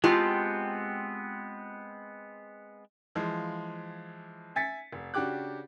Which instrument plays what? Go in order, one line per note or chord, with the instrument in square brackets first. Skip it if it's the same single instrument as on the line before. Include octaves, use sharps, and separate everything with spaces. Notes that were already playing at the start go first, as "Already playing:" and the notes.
[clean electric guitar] G#3 B3 C4 [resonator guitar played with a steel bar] F4 G4 A5
[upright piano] E3 F3 G#3
E5 G#5 A6 B6 C#7
F1
C#3 D4 F#4 G4 D6 F#6